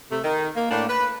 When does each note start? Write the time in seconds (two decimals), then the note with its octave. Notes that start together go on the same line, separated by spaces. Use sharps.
0.11 C3 A3
0.23 D#3
0.55 A#3
0.70 A2 A#3 D4
0.88 B4